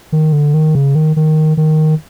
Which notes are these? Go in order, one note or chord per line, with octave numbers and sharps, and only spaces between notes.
D#3
D3
D#3
C#3
D#3
D#3
D#3